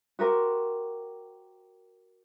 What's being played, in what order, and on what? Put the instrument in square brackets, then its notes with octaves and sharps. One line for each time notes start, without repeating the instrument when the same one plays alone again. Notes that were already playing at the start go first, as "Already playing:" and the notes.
[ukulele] F#4 G4 A#4 C5